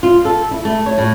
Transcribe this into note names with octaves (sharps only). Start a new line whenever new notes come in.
F4
A4
E4
A3
C#5
A2